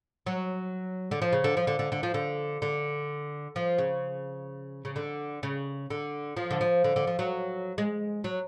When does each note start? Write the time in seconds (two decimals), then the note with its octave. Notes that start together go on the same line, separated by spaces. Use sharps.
0.26 F#3
1.11 D3
1.22 F3
1.33 C#3
1.44 D3
1.57 F3
1.67 D3
1.79 D3
1.92 D3
2.03 F3
2.14 D3
2.62 D3
3.56 F3
3.78 C#3
4.85 C#3
4.96 D3
5.43 C#3
5.90 D3
6.37 F3
6.51 D3
6.61 F3
6.84 D3
6.96 D3
7.07 F3
7.19 F#3
7.78 G#3
8.24 F#3